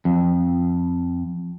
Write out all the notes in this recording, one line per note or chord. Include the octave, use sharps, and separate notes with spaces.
F2